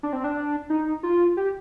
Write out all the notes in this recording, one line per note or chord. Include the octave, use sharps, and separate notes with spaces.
D4
C4
D4
D#4
F4
G4